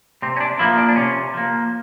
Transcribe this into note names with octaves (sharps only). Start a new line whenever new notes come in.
C3 C4
C#4
D4
F3 A#3 E4
D4
D4
C3 C#4
F3 A#3